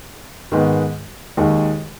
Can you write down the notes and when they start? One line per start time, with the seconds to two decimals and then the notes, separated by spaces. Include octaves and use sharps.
0.52 G#2 D#3 G#3 B3
1.37 D#2 D#3 G#3